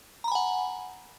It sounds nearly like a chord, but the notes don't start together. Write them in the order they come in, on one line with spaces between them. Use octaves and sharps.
A#5 B5 G#5 F#5